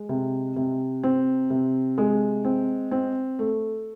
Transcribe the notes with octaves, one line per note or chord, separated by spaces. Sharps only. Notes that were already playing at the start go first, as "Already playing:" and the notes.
Already playing: G#3
C3
C3
C4
C3
G#3
C4
C4
A3